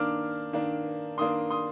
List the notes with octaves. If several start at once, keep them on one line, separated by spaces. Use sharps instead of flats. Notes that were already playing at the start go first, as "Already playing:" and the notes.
Already playing: D#3 A#3 D4 D6 F6
D#3 A#3 D4
D#3 A#3 D4 C6 D#6
C6 D#6